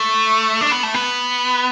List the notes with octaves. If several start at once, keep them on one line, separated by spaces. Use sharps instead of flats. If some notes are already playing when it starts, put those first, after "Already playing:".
Already playing: A3
D4
B3
A3
B3